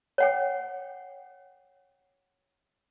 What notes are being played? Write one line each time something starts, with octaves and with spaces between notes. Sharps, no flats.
C#5 F#5 G5